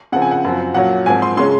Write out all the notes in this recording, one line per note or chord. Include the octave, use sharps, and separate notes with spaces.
C#3 F3 C4 F#5
G#5
F#5
F#2 F3 C4
A#2 F#3 C#4 F#5
G#2 F3 C4 G#5
C6
C#3 G#3 C#4 C6